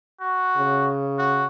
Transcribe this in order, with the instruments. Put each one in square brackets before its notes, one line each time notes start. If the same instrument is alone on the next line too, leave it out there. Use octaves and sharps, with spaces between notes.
[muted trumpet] F#4
[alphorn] C#3
[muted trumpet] F#4